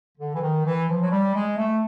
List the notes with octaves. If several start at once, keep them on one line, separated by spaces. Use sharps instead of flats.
D3
E3
D#3
E3
F3
F#3
G3
G#3
A3